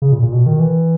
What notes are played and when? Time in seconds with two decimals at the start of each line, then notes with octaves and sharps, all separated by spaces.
0.02 C#3
0.12 A#2
0.22 A#2
0.32 B2
0.46 D#3
0.59 E3